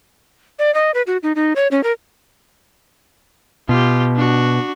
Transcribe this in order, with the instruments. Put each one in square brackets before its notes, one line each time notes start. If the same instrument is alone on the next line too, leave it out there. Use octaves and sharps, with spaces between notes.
[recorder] D5
D#5
B4
F#4
D#4
D#4
C#5
C#4
A#4
[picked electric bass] B2 [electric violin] F4 G4
[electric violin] D4 F#4